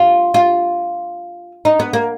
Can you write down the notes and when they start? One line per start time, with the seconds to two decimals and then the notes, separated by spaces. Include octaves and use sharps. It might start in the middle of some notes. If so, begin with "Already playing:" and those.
Already playing: F4
0.34 F4
1.65 D#4
1.80 B3
1.93 A#3